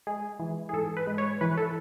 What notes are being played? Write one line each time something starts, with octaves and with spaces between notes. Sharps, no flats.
G#3 G#4
E3
G#4
G#2 A4
B4
G#3
C#5
E3 B4
A4